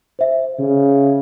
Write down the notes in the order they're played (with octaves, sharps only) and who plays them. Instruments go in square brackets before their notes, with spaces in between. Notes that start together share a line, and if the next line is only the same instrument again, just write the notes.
[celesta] C5 E5
[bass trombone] C#3